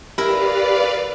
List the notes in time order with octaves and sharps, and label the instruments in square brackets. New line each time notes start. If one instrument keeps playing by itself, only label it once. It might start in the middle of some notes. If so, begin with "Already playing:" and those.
[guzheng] E4 A#4 [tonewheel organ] G4 [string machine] B4 D5 F5